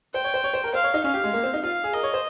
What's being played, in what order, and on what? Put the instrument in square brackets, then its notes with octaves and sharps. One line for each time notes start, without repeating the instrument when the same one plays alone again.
[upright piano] C5 [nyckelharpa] G5
[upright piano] C#5
C5
C#5
C5
A#4
[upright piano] C5 [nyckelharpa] F5
[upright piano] C#5
D#4
[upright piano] C#4 [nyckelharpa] F5
[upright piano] G4
G#3
A#3
C4
D#4
[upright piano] F4 [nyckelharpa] F5
[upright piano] G#4
[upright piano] A#4 [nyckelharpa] D#5
[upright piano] C#5
C5